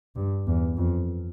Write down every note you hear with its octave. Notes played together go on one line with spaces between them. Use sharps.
G2
E2
F2